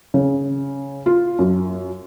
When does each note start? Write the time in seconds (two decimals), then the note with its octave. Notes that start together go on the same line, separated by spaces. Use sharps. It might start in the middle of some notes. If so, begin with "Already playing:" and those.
0.14 C#3
1.06 F4
1.39 F#2